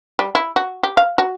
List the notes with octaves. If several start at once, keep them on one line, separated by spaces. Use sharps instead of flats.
G3
E4
F#4
G4
F5
F#4